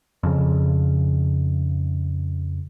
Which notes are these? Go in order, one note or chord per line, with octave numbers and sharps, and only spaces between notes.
F2 C#3